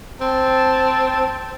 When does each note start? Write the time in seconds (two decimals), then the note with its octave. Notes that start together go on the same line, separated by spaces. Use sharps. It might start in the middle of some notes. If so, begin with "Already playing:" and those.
0.21 C4 A5